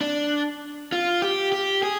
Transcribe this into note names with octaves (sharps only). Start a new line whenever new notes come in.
D4
F4
G4
G4
G#4